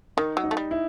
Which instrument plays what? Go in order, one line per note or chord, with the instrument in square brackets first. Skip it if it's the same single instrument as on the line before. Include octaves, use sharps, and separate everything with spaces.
[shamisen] D#3 [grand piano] D#4
[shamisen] F#3
[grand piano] D#4
[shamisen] A3
G3
[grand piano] E4